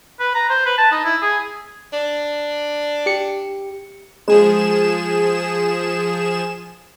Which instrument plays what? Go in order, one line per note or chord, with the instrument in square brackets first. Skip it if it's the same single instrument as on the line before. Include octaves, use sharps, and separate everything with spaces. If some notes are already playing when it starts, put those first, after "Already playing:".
[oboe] B4
A#5
C5
B4
A5
D#4
E4
G#4
[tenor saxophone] D4
[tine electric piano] G4 C#7
[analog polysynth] F3 G#4 E7 [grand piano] G#3